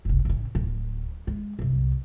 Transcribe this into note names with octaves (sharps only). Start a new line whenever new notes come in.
F1 C2
A1 C#3
D1
G#3
F#1 C2